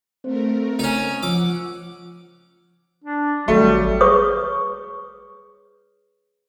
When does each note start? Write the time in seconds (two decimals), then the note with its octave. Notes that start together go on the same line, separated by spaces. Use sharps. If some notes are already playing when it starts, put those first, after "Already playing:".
0.24 A3 C4 A#4 C5
0.79 C#4 D#4
1.23 F3 F#5 D6 E6
3.04 D4
3.48 G#1 F#3 G3 A3
4.01 G#4 B4 C#5 C#6 D#6